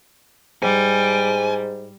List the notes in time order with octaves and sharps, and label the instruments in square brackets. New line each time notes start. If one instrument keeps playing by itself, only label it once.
[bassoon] G#2 [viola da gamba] G3 [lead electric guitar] G#5